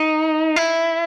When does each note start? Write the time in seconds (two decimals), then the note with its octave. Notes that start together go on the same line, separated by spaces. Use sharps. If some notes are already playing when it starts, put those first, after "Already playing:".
Already playing: D#4
0.56 E4